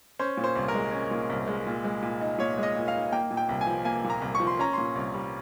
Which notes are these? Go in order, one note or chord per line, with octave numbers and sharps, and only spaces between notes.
C#4 C5
A#2
C5
C2
A#4
G#3
C#4
A#2
C2
G#3
A#2
G#3
A#2
D#4
A#2 C#5
G#3
D#5
A#2
F5
D#4
A#3 G5
A#2
G5
C2
G#5
F3
A#3 G#5
A#2
A#5
C2
C#6
F3
C6
C#4 A#5
A#2 C6
C2
G3